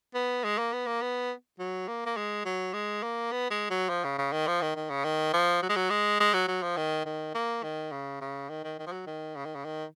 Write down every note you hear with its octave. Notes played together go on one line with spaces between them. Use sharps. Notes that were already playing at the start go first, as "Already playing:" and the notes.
B3
G#3
A#3
B3
A#3
B3
F#3
A#3
A#3
G#3
F#3
G#3
A#3
B3
G#3
F#3
F3
C#3
C#3
D#3
F3
D#3
D#3
C#3
D#3
F3
F#3
G#3
F#3
G#3
G#3
F#3
F#3
F3
D#3
D#3
A#3
D#3
C#3
C#3
D#3
D#3
D#3
F3
F#3
D#3
C#3
D#3
C#3
D#3